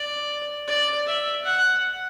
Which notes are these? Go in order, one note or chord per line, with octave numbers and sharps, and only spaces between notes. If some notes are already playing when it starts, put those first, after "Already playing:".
Already playing: D5
D5
E5
F#5